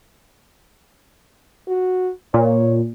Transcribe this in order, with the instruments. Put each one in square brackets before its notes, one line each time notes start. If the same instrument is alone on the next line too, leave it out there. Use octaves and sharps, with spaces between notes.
[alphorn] F#4
[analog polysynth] A#2 [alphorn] C#5